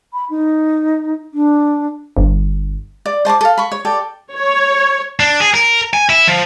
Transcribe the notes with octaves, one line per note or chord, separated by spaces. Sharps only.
B5
D#4
D4
G1
D5
C5 A5 C6 D6
A4 F5
B5 C#6
C#5
G4 A4 D5
C#5
D4
G#4
A#4
G#5
E4
F3